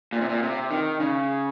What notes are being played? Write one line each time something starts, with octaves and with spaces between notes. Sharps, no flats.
A#2
C3
A#2
C3
D#3
C#3